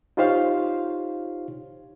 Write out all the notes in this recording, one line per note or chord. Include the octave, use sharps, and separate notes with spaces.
D#4 F4 G4 C5 C#5 F5